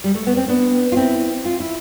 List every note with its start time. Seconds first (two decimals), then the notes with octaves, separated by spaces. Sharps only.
0.04 G3
0.15 A3
0.27 B3
0.37 C4
0.48 B3 D4
0.92 F4
0.97 C4 E4
1.45 F4
1.60 E4